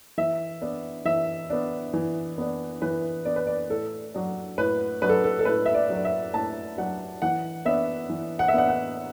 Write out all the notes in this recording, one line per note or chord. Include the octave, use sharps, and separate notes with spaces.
E3 E5
B3 D4
E3 E5
B3 D4
E3
B3 D4
E3 B4
B3 D4 D5
B4
D5
A2 A4
F#3 D4
A2 B4
F#3 D4 B4
A4
A4
A4
A2 B4
E5
D5
F#3 D4
E5
A2 A5
F#3 D4 F#5
E3 F#5
B3 D4 E5
E3
F#5
E5
B3 D4 F#5
F#5